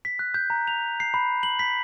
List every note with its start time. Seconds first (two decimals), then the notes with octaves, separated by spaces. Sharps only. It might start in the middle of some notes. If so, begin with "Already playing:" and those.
0.05 B6
0.19 F#6
0.34 G6
0.50 A#5
0.67 F7
1.00 C7
1.14 B5
1.43 F#7
1.59 B6